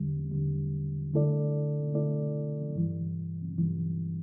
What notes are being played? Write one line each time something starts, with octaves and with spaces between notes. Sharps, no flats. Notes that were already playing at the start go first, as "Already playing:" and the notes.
Already playing: E2 D3 G3
E2 D3 G3
D3 A3 E4 A4 D5
D3 A3 E4 A4 D5
G2 E3 G3
G2 E3 G3